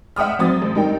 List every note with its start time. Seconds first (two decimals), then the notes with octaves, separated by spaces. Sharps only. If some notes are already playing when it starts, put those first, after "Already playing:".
0.16 E5 F#5 G5 D#6 F6
0.39 F#3 C4 D#6 A6
0.62 A1
0.75 G2 D#4 A#4 G5